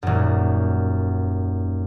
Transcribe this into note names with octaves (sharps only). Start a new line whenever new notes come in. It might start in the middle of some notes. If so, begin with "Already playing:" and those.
D#1 F#2